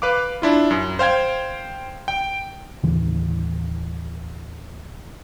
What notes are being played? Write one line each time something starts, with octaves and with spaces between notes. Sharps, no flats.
B4 F5 D6
D4 E4 F4
F#2
C5 F5 G5 G#6
G5
D#2 A2 C#3 E3